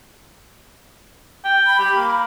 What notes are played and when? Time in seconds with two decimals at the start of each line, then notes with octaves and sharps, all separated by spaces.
1.45 G5
1.66 B5
1.79 G4
1.95 A#3